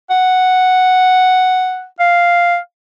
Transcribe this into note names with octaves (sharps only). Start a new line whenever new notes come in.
F#5
F5